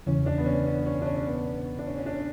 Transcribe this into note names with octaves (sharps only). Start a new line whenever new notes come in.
E2 C#3 E3 C#4
D4
B3
C#4
C#4
C#4
D4
C#4
C#4
B3
D4
C#4
C#4
D4